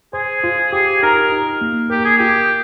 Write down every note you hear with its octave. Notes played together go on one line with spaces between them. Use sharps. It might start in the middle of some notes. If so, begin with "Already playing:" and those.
G#4 C5
F4
G4 G#4
D#4 A#4
D#4
A#3
G4 A#4
G#4
F4 G4